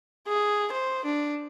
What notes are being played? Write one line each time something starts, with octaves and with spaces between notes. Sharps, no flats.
G#4
C5
D4